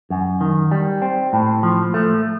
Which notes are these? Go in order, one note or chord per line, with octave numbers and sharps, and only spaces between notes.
F#2
D#3
G3
C4
A2
F3
A3